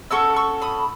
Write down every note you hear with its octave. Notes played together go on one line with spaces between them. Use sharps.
C#4 F#4 A4 C#6 E6
C#6 E6
B5 D#6